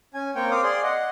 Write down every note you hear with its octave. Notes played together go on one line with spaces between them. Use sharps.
C#4 G#5
A#3 C4 C#5 G5
C4 F5 D6 D#6
G#4 D5 C6
D#5 F#5